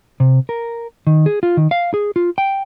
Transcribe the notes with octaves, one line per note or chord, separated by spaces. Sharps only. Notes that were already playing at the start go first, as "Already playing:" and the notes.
C3
A#4
D#3
G#4
F4
D#3
F5
G#4
F4
G5